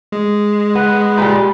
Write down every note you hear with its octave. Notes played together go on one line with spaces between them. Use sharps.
G#3
B3
A#2 G3